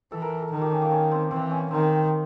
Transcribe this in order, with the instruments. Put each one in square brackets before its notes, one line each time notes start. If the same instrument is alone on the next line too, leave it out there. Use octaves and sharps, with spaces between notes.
[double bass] E3 [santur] A4
[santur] A#4
A4
[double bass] D#3
[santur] G4
C#4
A#3
C#4
C4
[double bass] E3 [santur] C4
[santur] C#4
[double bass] D#3 [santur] C4